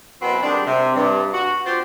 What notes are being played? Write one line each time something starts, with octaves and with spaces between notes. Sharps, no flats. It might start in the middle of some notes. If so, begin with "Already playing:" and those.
F#2 B2 C4 E4 F#4 B4
D#3 G3 G#3 D4
C3
G2
F#4
C4 F4 G4 C5